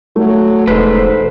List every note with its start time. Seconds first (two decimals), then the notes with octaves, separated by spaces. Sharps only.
0.16 F#3 A3
0.67 E1 G#2 A4 B4 C5